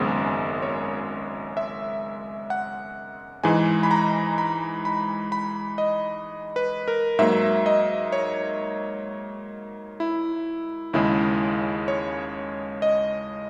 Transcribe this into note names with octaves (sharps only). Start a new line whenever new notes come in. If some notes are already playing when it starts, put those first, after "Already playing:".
Already playing: G#1 F#2 C#3 G#3 B3
C#5
E5
F#5
G#2 E3 G#3 G#5
B5
A#5
B5
B5
B5
D#5
B4
A#4
G#2 F#3 A#3 E5
D#5
C#5
E4
D#2 C#3 G#3 E4
C#5
D#5